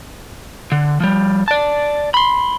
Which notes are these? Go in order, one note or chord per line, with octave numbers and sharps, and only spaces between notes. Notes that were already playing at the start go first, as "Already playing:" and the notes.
D3
F3 G3
D5 A5
B5 C6